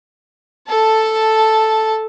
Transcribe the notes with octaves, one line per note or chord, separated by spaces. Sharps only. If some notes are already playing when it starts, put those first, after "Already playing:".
A4 A5